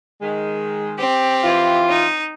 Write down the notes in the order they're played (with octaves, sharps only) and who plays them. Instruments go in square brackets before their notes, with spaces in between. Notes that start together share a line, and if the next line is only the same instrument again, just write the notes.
[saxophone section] D#3 G#3
[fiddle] C4 G4
[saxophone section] E3 F4
[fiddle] D#4